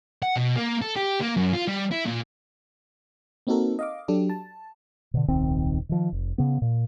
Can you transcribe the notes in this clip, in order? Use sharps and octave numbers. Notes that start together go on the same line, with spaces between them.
F#5
B2
A#3
A4
G4
A#3
F#2
F4
G3
E4
A#2
A#3 C4 D#4 F#4 A4 A#4
D#5 F5 D6
F#3 D4 G4 A4
A5
B2 D3
D#1 C2 D#3 C4
D#3 F3
F1
C#3 B3
A#2